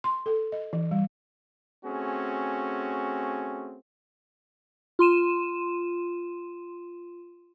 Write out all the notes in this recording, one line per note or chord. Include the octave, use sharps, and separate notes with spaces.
C6
A4
D#5
E3
G3
A3 C4 C#4 F#4 G#4
F4 C6 D#7 E7